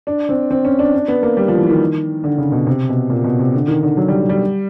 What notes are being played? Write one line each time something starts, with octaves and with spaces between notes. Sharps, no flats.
D4
C4
C4
C#4
D4
D4
B3
A#3
G3
F3
E3
D#3
D3
C#3
B2
C3
B2
A#2
B2
C3
D3
D#3
D3
F#3
G3
G3